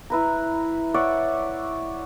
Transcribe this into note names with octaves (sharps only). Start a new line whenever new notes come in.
E4 B4 A#5
C#5 D5 E5 F#5